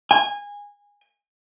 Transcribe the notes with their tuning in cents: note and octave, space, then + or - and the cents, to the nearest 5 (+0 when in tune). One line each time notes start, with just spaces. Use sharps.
G#5 -20